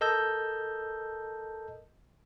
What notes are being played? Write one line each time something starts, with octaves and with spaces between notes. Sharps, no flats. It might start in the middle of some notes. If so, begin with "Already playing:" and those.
A4 A#4 D#5 A5 E6 G6